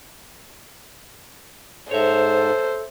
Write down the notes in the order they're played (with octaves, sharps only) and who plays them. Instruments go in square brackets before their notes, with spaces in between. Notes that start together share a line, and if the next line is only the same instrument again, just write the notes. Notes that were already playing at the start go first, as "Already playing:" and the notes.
[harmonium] G#2 [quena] A4 [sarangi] C5 [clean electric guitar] C#5 E5